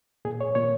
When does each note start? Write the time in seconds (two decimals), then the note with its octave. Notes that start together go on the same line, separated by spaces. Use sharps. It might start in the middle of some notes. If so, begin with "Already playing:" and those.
0.25 A#2 G#4
0.41 C#5
0.55 A#2 C#5